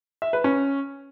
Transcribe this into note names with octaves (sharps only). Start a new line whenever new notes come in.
E5
B4
C#4